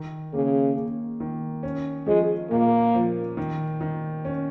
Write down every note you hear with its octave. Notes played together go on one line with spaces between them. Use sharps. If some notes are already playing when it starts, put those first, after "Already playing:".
Already playing: D#3
C#3 A#3
A#3
D#3
C#4
F3 G#3
A#2 A#3
F3
D#3
D#3
C#4